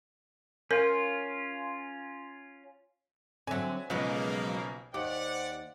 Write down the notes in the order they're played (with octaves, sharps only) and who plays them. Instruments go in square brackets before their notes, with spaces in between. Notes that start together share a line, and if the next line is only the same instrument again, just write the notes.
[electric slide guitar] C#4 F4 [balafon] A#4
[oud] D3 F#3 [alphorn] C4 [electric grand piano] E5 G#5
[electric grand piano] B1 C#3 F3 [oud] F#3 G#3 B3 [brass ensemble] A#3 [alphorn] B4
[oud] D#2 [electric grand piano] G4 D6 [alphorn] C5 [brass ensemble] D5 F#5